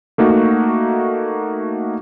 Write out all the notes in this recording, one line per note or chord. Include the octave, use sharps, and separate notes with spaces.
A3 A#3 D#4 F#4